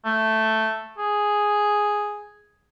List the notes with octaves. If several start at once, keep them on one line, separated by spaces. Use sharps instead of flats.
A3
G#4